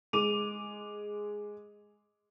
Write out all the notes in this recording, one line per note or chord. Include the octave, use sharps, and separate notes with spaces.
G#3 D6 D#7 F7